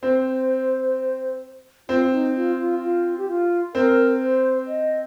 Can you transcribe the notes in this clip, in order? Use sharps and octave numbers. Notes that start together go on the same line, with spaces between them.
C4 C5
C4 F4
D#4
F4
F4
F4
G4
F4
C4 A#4
C5
D#5